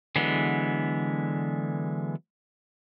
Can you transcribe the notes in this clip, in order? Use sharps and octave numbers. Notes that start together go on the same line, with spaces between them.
D3 E3 F#3 G#3 B3